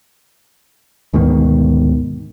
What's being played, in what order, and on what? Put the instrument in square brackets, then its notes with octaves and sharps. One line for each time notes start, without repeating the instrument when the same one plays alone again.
[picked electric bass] D2 G#2 B2 D#3